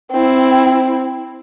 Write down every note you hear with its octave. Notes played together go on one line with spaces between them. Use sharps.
C4 E4